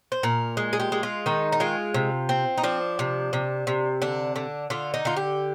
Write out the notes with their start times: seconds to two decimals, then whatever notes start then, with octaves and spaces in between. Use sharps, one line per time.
0.12 C5
0.23 A#2 A#4
0.57 G#3
0.73 G#4
0.80 G4
0.92 G#3
1.03 F4
1.26 D#3 D#4
1.52 D#4
1.60 G#3 F4
1.94 C3
2.29 C4
2.58 D#4
2.63 F3 D4
2.99 C3
3.33 C3
3.67 C3
4.02 D3 D4
4.36 D3
4.70 D3 F4
4.94 D#4
5.05 D3 F4
5.17 G4